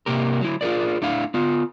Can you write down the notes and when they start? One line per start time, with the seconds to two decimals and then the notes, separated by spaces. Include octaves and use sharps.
0.06 C3 A#3 G4 A#4
0.41 F#3 E4
0.61 F4 G#4 A#4 D5
1.02 A3 D4 E4 F5
1.34 B3 F4